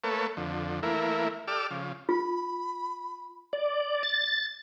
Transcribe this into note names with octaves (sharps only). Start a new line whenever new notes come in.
A3 A#3 A4 B4 C#5
F2 D3
E3 A3 A#3 E4 A#4
G4 A4 D5 D6 E6 F6
C#3 F3
F4 B5
D5
A6